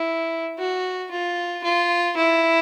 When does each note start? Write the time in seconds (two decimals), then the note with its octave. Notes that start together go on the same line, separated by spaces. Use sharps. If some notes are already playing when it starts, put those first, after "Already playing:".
Already playing: E4
0.59 F#4
1.11 F4
1.64 F4
2.17 E4